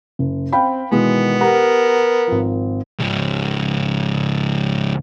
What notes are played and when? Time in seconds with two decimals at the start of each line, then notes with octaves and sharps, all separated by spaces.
0.19 F#1
0.53 C4 F5 G5 B5
0.92 B2 D#3 E3 G#3 B3
1.40 G4 A#4 F#5 A#5
2.27 G#1 F3
2.99 C#2 G#2